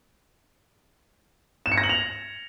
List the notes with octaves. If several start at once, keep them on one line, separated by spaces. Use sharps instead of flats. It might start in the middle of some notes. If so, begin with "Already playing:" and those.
E7
C#7
A#6
F#7
F7